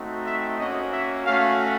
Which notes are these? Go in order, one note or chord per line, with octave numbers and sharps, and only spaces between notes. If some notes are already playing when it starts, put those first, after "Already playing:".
Already playing: A3 C4 D#4 F#4
E5
A#3 C#4 F#4 D#5
E5
A3 C#4 F#4 F5